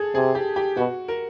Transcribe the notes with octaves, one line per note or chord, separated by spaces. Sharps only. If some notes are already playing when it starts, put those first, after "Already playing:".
Already playing: G#4 A4
C3 G#4
G4
G4
B2 F#4
A#4